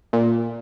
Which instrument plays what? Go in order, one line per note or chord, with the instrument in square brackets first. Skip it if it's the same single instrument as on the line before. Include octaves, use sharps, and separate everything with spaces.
[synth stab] A#2